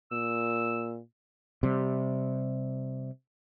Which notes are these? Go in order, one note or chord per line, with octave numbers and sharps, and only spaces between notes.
A#2 E6
C3 G3